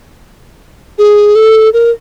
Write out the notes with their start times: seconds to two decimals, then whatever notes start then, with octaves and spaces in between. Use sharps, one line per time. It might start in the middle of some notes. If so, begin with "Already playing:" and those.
0.98 G#4
1.35 A4
1.74 A#4